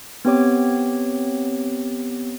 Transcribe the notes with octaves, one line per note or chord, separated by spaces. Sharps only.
B3 C4 G4 C#5 D6